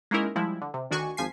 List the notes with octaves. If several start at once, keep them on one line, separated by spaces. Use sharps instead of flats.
G#3 A#3 C#4 D#4 E4 A#4
F3 G3 G#3 E4
D3
C3
D2 D#3 D4 F#4 G#5 C#6
G#1 F3 G#5 B6 C7